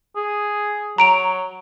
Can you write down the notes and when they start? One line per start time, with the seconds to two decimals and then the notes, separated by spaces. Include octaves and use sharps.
0.16 G#4
0.98 F#3 A#5 D7 F7